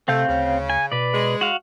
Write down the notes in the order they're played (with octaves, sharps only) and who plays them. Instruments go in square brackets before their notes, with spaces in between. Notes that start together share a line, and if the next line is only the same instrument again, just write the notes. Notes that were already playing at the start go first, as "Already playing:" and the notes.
[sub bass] C3 [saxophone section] A3 [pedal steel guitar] C4 F5 G6
[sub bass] D2 [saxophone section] C#3
[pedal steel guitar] G#5
[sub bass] B2 [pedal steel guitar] B4 D5
[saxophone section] G#3
[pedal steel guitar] F#4 F5